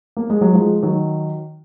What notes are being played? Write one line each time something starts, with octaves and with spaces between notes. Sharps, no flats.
A#3
G#3
F#3
F3 G#3
D#3 F#3